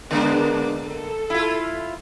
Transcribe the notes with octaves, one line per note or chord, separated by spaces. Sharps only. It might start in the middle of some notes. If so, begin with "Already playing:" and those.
D3 G#3 A#3 B3 D4
A4
E4 F4